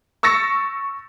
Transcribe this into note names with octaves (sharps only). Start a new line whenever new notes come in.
C#6 E6 A6 A#6 C#7